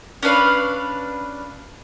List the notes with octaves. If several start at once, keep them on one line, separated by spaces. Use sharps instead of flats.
C#4 D4 B4 F5